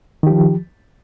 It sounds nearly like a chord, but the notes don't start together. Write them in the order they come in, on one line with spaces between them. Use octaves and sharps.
D#3 G4 F3